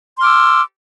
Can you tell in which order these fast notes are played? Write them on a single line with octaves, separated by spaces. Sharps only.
C6 F6 D6 E6